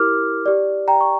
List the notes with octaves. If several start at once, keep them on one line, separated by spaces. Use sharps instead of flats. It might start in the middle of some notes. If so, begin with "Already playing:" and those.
Already playing: E4 G4 A#4 D6 F6
G4 D5
G5 A#5
C#6